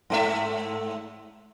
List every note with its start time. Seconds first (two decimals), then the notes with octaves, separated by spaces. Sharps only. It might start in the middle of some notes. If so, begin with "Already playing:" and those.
0.10 G#2 A3 E5